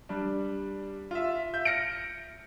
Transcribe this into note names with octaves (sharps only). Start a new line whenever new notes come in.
G3 D4
F4 E5
E5 G6
F6 A#6 C#7 D7